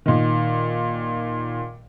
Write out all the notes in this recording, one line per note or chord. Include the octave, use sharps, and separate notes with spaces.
A#2 D#3